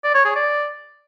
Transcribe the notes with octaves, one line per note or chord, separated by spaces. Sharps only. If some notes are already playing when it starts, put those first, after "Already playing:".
D5
C#5
G#4
D5